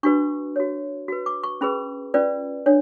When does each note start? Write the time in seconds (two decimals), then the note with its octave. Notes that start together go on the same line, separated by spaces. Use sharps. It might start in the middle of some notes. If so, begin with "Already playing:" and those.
0.03 D4 F#4 B4 C#6
0.56 F#4 C#5
1.08 F#4 B4
1.26 D6
1.43 C#6
1.61 C#4 G#4 B4 B5
2.14 C#4 F4 B4 D5
2.66 D4 C#5